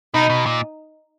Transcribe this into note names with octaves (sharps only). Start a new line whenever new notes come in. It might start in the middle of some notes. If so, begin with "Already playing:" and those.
B2 D#4
B2
A#2